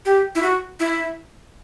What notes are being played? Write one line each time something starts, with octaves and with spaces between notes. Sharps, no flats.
G4
E4
F#4
E4